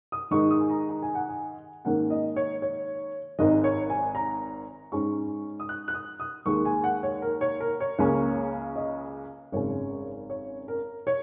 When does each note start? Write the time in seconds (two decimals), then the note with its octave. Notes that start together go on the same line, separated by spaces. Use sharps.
0.12 D#6
0.31 G#2 D#3 G#3 D#4 C#6
0.51 D#6
0.60 G#5
0.69 A#5
0.89 A#5
1.02 G#5
1.15 F#5
1.28 G#5
1.85 G#2 D#3 A#3 C#4 F#5
2.10 D#5
2.36 C#5
2.62 C#5
3.39 G#1 G#2 D#3 D#5
3.64 C#5
3.90 G#5
4.15 A#5
4.92 G#2 G#3 C#4 C#6
5.60 D#6
5.69 F#6
5.88 F#6
5.94 D#6
6.20 D#6
6.46 D#2 D#3 G#3 C#6
6.65 G#5
6.84 F#5
7.03 C#5
7.22 A#4
7.41 C#5
7.60 A#4
7.80 C#5
7.99 C#2 C#3 A#3 C#4
8.76 D#5
9.52 G#1 F#2 C#3 G#3 C#4 C#5
10.30 C#5
10.68 A#4
11.07 C#5